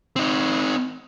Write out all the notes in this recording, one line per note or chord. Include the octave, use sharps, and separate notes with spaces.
C4 D#4